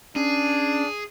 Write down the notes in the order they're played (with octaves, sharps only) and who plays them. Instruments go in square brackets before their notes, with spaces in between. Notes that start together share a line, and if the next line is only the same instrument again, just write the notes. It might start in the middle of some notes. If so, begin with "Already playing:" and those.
[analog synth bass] C#4 [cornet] D4 [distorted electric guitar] G#4